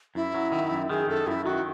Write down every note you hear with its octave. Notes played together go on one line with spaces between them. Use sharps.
F#2 E4
F#3
D#3
F#2
D#3 G#4
F#2 A4
F#2 E4
D#3 F#4